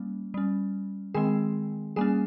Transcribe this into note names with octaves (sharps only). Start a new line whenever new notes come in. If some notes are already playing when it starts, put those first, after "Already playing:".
Already playing: G3 A#3 C#4
G3 C#4
D#3 G#3 C4 G#4 G#5
G3 A#3 C#4 G#4 G#5